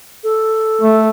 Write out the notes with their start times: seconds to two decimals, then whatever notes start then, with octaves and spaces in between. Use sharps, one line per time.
0.24 A4
0.82 A3